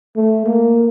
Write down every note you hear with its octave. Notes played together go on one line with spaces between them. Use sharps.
A3
A#3